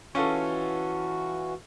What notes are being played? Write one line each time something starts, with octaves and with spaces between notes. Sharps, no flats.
E3 C#4 F4 F#4 A4